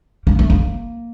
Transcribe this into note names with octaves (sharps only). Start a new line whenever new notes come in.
A#3
A3
A#3